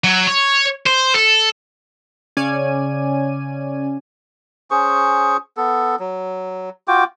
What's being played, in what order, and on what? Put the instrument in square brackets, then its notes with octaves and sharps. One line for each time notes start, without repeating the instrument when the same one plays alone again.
[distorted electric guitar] F#3
C#5
C5
A4
[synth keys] C#3 C#4 D5 G#5 D#7
[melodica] C#4 G#4 C5 C#6
B3 A4
F#3
F4 F#4 G5 D6